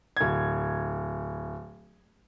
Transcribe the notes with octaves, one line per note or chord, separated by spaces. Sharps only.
D1 G#6